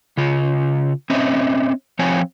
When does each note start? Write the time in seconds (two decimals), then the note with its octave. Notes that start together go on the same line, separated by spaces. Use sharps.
0.17 C#3 F4
1.10 C4 C#4 D#5 E5
1.99 F3 C4 C#5 F5 G5 G#5